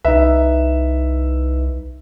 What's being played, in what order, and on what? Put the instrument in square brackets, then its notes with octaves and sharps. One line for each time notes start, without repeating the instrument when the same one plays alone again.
[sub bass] C2 [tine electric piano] D#4 B4 [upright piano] E5